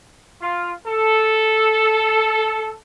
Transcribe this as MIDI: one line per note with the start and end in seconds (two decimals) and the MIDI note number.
0.41 0.72 65
0.87 2.73 69